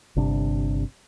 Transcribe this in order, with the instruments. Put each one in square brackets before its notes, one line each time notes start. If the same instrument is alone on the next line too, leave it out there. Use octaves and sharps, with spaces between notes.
[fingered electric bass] G1 C3 D4